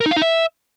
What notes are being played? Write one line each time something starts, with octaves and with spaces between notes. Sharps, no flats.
A#4
D#4
F5
D#4
E5